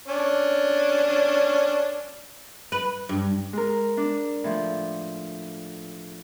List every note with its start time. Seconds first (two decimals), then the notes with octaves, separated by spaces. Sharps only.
0.08 C#4 D4
2.72 B4
3.09 G2
3.53 G#3 A#4
3.97 D4
4.44 A2 F3